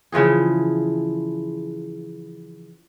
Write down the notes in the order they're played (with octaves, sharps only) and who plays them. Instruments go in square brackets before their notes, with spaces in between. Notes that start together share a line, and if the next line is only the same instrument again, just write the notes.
[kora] C#3 E3 F3 G#4